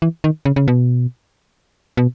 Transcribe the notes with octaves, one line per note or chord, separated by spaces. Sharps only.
E3
D#3
C#3
C#3
B2
B2